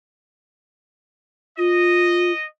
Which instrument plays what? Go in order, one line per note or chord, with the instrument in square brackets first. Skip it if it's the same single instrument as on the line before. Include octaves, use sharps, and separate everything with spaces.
[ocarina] F4 [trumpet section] D#5